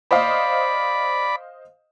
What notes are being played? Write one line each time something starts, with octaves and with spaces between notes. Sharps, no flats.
C5 D5 D#5 F5 B5